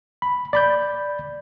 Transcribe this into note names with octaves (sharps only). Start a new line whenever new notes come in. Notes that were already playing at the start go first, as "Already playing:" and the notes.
B5
D5 B5 G6